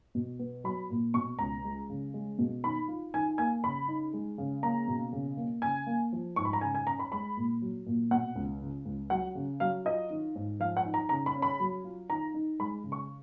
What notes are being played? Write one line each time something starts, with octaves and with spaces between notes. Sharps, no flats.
B2
B3
F#3 B5
A#2
B2 C#6
C#2 A#5
G#3
C#3
G#3
B2
D#3 B5
F4
D#3 G#5
A#3 G#5
C#3 B5
D#4
G#3
C#3
A#3 A#5
B2
C#3
A#3
C#3 G#5
A#3
F3
G#2 C#6
B5
A#5
C#3 G#5
G#5
C#4 A#5
B5
G#3 B5
A#2
F#3
A#2
B2 F#5
C#2
C#3
C#2
F#3 F#5
C#3
F#3 F5
F4 D#5
D#3
G#2
F3 F5
F#5
D#4
A#5
C#3 A#5
B5
C#4
B5
F#3
F4
D#3 A#5
D#4
G#3 B5
C#3
C#6